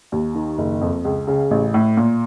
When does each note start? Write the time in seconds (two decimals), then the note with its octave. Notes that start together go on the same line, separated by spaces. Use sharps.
0.12 D#2
0.35 D#3
0.58 F#1
0.81 F2
1.05 C#2
1.27 C#3
1.51 A1
1.74 A2
1.97 A#2